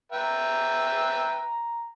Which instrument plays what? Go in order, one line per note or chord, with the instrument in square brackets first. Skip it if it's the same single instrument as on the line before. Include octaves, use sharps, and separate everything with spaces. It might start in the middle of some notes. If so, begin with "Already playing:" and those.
[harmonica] B4 E5 G5 [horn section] A#5